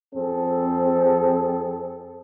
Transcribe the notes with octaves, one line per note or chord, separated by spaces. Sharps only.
F2 C4 G#4 A4